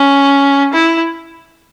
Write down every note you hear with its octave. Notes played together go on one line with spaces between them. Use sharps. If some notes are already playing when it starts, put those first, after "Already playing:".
Already playing: C#4
E4